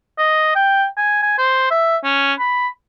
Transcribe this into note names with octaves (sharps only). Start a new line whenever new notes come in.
D#5
G5
G#5
G#5
C5
E5
C#4
B5